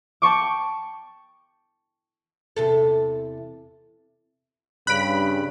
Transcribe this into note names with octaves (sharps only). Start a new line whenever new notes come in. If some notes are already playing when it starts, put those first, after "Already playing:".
G5 A5 C#6 D6
E2 C3 A4
G2 C#3 B5 F#6 D7